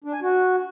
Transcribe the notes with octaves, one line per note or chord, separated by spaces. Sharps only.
D4
G#5
F#4